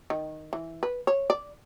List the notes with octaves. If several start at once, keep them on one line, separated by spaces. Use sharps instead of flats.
D#3
E3
B4
C#5
D5